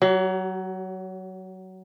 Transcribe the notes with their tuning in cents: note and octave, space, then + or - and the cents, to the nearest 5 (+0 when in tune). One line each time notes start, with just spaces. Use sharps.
F#3 +20 G4 -40